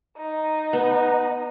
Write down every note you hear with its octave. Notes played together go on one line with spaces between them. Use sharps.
D#4
B3